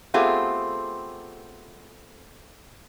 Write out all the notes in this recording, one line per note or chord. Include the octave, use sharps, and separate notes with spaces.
A3 B3 C4 F4 G4 G#4